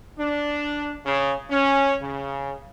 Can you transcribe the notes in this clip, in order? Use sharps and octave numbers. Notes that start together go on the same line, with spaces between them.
D4
C#3
C#4
C#3